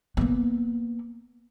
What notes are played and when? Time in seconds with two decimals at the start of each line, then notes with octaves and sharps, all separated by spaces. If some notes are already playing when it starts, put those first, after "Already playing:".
0.17 A#3 B3